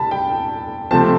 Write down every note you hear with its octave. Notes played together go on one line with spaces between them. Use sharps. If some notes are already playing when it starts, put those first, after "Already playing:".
Already playing: C3 A5 B5
G5
C3 F3 A3 C4 A5